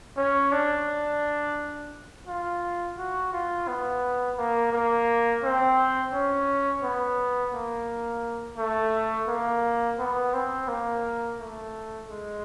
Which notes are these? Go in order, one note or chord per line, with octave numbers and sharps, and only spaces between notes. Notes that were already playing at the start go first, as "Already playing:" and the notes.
C#4
D4
F4
F#4
F4
B3
A#3
A#3
C4
C#4
B3
A#3
A3
A#3
B3
C4
A#3
A3
G#3